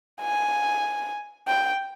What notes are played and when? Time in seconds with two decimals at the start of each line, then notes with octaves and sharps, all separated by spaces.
0.22 G#5
1.48 G5